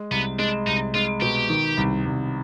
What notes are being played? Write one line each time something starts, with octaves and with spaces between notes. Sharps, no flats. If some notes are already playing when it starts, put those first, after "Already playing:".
Already playing: G#3
C2 B3
G#3 D4
C2 D#4
G#3 F4
B2 G4
D#3
C2
C2